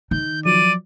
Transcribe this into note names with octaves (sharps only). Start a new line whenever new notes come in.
D#3 G6
F3 F#3 D5 D#7